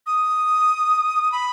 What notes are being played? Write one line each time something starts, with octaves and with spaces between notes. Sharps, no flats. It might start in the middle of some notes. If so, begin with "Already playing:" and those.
D#6
B5